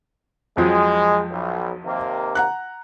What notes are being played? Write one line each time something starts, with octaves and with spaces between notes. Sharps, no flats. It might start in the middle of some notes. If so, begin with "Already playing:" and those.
F2 F3 F#3 G#3
B1
D#2 C3 A#3
F#5 A#5 F#6